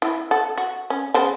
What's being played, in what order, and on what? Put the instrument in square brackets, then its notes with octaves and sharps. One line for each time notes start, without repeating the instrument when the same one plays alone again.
[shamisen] E4
A4 F#5
F#4
C#4
C#3 B3 C5